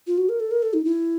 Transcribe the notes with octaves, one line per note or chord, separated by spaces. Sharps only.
F4
F#4
A#4
A4
A#4
A4
D#4
E4